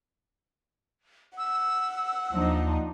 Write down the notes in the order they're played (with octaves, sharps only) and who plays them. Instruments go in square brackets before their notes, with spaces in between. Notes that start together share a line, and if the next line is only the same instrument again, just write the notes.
[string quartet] F#5 [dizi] E6
[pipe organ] D#2 [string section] F3 D4 D#4